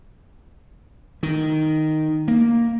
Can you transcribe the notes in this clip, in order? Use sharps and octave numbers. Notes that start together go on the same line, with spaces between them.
D#3
A#3